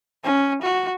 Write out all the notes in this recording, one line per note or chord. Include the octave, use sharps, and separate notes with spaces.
C#4
F#4